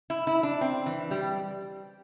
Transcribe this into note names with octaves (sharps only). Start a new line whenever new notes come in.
E4
E4
D4
C4
E3
G3